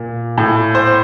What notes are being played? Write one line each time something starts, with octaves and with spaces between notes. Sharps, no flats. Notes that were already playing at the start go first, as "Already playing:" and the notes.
Already playing: A#2
A2
C5